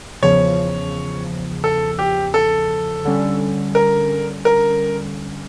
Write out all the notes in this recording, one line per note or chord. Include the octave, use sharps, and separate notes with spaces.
E2 C#3 F3 C#5
A4
G4
A4
D3 G3 C#4
A#4
A#4